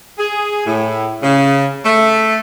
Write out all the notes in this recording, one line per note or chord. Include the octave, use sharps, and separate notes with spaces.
G#4
A2
C#3
A3